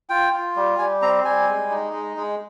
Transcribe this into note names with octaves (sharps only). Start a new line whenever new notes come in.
F4 G5
F4
G3
G3 G#5
C4 A#5
G3 G#5
G#3
D#4
G#3
G#3